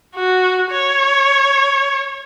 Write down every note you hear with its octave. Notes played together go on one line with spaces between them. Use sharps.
F#4
C#5